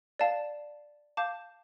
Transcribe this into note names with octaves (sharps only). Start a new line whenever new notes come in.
D5 F5 A5
F5 A5 D6 G6